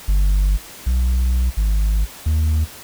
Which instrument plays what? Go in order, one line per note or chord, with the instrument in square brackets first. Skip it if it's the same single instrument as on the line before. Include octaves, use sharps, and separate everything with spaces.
[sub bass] G1
B1
G#1
D#2